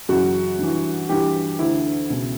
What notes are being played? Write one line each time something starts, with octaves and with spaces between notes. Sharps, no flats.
F#2 C#3 E3 F#4
G2 E3
G2 E3 G4
D2 D3 E4
C#2 B2